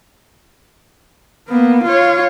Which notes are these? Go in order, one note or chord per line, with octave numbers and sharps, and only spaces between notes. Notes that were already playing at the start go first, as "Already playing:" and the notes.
A#3 B3
F4 C#5